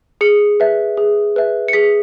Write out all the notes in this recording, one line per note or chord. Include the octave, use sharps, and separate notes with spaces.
G#4 C#7
B4 E5
G#4
B4 E5
C#7
G#4 B6